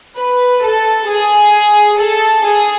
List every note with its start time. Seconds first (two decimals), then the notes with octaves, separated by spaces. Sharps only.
0.18 B4
0.64 A4
1.09 G#4
1.99 A4
2.45 G#4